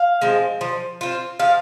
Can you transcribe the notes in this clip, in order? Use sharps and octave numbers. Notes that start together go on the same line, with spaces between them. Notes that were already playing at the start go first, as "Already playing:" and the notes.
Already playing: F5
F3 G#3 C4
F3
C4 F4
F3 F5